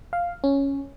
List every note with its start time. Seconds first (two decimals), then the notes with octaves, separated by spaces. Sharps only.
0.13 F5
0.44 C#4